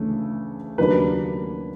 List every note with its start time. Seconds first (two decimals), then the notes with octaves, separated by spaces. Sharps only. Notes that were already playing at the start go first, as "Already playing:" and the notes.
Already playing: D2 C#3 E3 A3
0.78 D#2 C#3 F#3 A#3 D4 B4